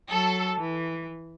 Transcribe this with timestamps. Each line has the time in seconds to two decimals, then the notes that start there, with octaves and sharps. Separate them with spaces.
0.10 F#3 A4
0.60 E3